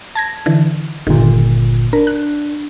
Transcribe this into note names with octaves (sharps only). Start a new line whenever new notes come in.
A5 G#6 A#6
D3 E3
G1 A#2 D#3
D4 A#4
F#6